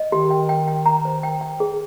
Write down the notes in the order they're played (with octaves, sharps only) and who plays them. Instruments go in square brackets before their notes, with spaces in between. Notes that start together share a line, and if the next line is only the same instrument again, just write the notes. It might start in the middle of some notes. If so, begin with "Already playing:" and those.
Already playing: [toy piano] D#5
[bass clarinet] D#3 [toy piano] G4
[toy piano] G5
G5
G5
A#5
C5
G5
G5
G#4